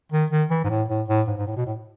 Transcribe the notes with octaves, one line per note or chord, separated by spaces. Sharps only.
D#3
D#3
E3
G#2
A2
A2
A2
G#2
G#2
A2
B2
A2